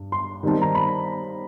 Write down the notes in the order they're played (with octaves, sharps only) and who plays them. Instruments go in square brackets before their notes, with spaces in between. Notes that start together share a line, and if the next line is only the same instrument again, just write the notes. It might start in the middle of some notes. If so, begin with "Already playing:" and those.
Already playing: [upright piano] G2
C6
D#3 G3 C4 D#4 A5
A#5
B5